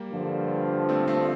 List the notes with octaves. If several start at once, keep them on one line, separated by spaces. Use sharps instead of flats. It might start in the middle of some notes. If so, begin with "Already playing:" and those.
Already playing: G3 A#3
G2 D3 F3
A3 C4
A3 C4